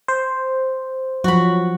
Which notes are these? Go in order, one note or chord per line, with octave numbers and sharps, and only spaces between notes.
C5
F3 F#3 F#4 B5